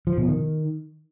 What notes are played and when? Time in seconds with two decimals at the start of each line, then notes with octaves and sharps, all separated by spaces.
0.07 F3
0.18 B2
0.28 D#3